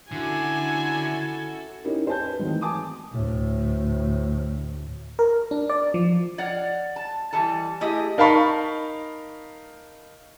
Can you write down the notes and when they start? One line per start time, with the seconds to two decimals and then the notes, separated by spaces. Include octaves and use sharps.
0.12 D3 C#4 E4 F#4 A4 G#5
1.84 C#4 D#4 E4 G4 A#4
2.07 C5 G#5 A5 G6
2.25 B4
2.39 D#3 E3 F#3 G#3 A3 C4
2.61 G#5 A5 D6 D#6
3.12 D2 A2
5.19 A#4
5.51 D4
5.70 D5
5.94 F3
6.38 C#5 D5 F5 F#5
6.96 A5
7.33 E3 G3 A4 A5
7.81 A3 E4 G4 G#4 D#5
8.18 D#4 A#4 F5 A5 B5 C#6